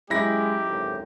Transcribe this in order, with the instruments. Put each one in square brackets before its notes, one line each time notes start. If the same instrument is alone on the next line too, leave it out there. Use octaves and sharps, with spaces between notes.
[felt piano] F#2 [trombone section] G#3 [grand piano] E4 B5 A#6 [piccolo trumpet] G4
[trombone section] G#1 D2 A2